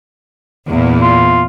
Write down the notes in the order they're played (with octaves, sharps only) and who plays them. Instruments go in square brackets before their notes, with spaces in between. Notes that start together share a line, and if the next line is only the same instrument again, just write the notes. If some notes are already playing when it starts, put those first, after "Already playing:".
[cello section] E2 A#2
[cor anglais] F4